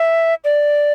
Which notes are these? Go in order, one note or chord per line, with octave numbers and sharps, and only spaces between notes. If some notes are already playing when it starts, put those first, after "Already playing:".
Already playing: E5
D5